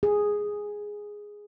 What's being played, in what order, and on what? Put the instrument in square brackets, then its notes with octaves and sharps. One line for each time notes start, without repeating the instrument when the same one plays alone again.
[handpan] G#4